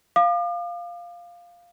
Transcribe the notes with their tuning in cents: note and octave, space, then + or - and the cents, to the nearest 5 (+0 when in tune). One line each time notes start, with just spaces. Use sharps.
F5 +0 D6 +45